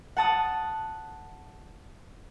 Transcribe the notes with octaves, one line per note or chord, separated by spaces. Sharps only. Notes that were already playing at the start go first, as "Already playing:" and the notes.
F#5 A5 D#6